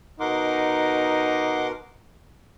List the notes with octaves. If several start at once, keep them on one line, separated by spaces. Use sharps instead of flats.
B2 D#4 A#4 F#5 C6 D6